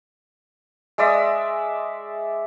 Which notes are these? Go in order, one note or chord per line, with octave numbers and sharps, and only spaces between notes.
G#3 D5 E5 D#6